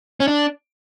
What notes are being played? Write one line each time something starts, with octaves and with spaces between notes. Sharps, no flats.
C#4
D4